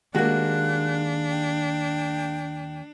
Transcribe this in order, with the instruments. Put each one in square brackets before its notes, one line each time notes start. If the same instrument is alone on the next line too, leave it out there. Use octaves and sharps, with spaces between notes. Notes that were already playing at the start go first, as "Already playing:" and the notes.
[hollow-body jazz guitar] D#2 F#4 [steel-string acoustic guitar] G#3 A#3 [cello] D4 [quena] F#6
[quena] G5